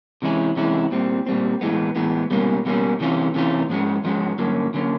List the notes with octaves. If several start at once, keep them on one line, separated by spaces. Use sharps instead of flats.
C3 E3 G#3 C#4 E4
C3 E3 G#3 C#4 E4
A#2 G3 C4
A#2 G3 C4
A2 E3 G#3 B3
A2 E3 G#3 B3
C#2 B2 G3 A#3 C#4
C#2 B2 G3 A#3 C#4
C3 E3 A3 C#4 F4
C3 E3 A3 C#4 F4
G#2 F3 G#3 C#4 F#4
G#2 F3 G#3 C#4 F#4
G2 D3 F#3 A#3 C#4
D3 F#3 A#3 C#4